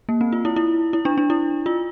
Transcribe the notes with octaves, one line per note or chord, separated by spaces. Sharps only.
A#3
C4
F4
E4
E4
E4
D4
D4
E4
F4